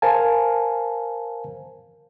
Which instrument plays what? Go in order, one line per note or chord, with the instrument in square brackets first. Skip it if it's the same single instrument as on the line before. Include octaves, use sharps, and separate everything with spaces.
[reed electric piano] A#4 C5 F5 G#5 A5